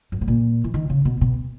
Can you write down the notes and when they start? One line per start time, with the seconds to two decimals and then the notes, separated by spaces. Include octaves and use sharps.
0.12 F#2
0.21 G#2
0.28 A#2
0.64 E3
0.74 D#3
0.89 C#3
1.05 B2
1.21 B2